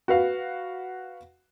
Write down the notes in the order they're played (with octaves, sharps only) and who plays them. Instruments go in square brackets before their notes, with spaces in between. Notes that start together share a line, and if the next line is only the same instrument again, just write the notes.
[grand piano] F#4 B4 F5